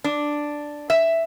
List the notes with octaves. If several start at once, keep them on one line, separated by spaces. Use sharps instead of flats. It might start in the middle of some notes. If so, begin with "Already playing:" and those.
D4
E5